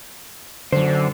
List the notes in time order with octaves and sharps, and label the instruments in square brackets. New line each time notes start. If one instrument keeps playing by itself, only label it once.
[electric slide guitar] F#2 C5 [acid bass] D3